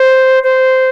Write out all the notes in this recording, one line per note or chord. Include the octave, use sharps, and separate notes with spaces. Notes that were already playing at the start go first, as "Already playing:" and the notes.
Already playing: C5
C5